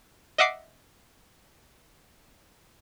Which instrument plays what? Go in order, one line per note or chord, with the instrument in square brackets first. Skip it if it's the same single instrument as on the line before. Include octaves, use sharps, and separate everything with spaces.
[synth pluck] D#5 E5 F#5 D6 C7